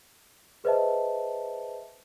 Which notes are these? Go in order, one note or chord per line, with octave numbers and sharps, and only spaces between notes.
G#4 B4 C5 D#5 E5 A5